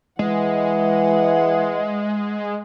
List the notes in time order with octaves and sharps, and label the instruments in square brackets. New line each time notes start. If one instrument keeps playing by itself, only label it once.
[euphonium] E3 [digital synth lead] G#3 [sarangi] F#5